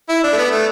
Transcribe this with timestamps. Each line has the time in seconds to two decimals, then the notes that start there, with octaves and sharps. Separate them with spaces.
0.09 E4
0.24 D4
0.32 A3
0.37 B3
0.51 A3